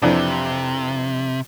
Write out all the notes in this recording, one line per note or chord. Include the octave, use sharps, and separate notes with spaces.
F2 C3 E3 D4